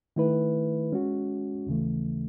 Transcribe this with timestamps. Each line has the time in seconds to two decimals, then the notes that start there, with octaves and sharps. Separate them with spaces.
0.16 D#3 A3 E4 B4
0.92 G#3 C#4 F#4
1.67 D#2 C#3 E3 A3